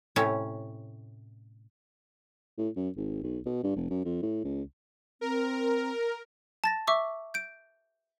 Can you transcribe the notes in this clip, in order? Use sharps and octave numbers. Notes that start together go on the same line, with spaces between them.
A2 C3 C#4 E5
A2
F#2
G#1
B1
B2
G2
F1
F#2
F2
A2
C#2
C4 A#4
A5 A6 A#6
E5 C#6 D6 E6
G6 D7